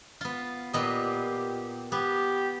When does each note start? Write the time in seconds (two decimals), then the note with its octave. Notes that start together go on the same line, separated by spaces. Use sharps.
0.21 B3 F4
0.73 A#2 B3 G4 D#5
1.92 B3 G4